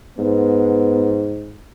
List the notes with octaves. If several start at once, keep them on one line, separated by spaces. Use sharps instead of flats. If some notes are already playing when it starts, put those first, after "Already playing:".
G#2 B3